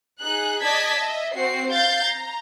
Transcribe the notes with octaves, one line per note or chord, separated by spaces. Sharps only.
D#4 G#4 F#6
D5 D#5 A5 G#6 B6
D#5 E5
C4 F#4 C7
F5 G6 A6 C7
A#5